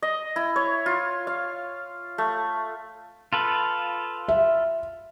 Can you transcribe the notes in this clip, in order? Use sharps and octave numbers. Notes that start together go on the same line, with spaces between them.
D#5
E4
C#5
F4
F5
A3
F4 A4 B4
E5